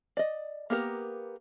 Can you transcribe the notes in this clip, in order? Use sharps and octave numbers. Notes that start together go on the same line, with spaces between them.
D5 D#5
A#3 B3 G4 A#4